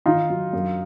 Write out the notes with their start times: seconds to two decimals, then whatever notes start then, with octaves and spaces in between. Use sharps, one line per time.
0.06 D#3 D#4 F4
0.30 F#3
0.53 F#2